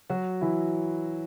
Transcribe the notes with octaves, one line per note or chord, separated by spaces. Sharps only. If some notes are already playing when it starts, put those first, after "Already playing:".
F#3 F#4
E3 E4